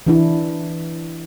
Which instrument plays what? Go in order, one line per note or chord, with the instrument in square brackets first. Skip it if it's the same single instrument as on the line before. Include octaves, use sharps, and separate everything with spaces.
[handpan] E3 D4 E4